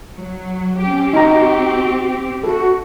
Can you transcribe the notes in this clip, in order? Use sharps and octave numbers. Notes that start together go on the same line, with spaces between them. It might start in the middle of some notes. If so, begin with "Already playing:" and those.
F#3
C4 C#4 G4
D#4 F#4 A#5
F#4 A4